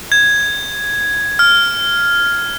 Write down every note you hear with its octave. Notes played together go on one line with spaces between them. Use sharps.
G#6
F6